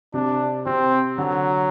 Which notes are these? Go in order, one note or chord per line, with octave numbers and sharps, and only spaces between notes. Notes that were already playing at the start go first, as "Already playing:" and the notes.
C3 D4
C3 C4
D3 F#3